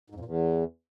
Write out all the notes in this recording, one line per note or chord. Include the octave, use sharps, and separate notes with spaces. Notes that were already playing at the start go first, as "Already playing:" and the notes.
G#2
F2
A#2
E2